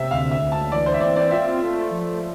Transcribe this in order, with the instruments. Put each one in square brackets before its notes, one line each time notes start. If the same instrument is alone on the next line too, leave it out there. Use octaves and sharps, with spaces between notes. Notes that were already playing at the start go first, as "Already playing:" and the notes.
Already playing: [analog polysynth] C3 [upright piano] E5
[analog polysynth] D2 [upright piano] F5
[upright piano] E5
[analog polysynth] D2
[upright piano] A5
[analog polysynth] E3 [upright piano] D5
[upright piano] C5
E5
[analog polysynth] C4 [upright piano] D5
[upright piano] D5
[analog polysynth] F4 [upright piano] E5
[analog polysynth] A3
F3